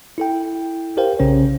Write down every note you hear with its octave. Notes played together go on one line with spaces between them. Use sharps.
E4 A4 G5
G4 A#4 C5 F5 G5
B1 C#3 C#4 C5 C#5